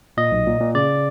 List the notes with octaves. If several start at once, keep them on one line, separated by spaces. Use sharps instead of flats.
A#2 D#5
B1
A#2
A#2
C#3 D5